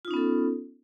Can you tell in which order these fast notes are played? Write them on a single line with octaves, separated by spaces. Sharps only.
F4 D#4 C#4 B3 A4